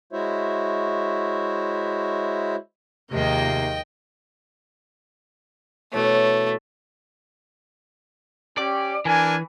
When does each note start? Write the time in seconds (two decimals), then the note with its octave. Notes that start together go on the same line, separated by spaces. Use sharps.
0.13 G#3 E4 F#4 C5 C#5 E5
3.12 D#2 C3 D#3 F3 G#3 A#3 D#5 G5
5.93 B2 E3 A3 C#5
8.57 C#4 G4 D5
9.05 E3 D4 A#4 G#5